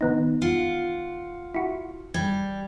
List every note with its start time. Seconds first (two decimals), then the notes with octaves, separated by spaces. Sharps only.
0.01 D#3 B3 D#4
0.42 F4 F#5
1.55 E4 F#4
2.14 G3 G#6